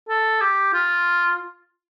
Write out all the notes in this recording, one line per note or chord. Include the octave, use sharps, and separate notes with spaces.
A4
G4
F4